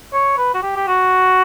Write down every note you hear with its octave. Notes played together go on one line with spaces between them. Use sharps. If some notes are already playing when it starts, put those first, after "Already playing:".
C#5
B4
F#4
G4
G4
F#4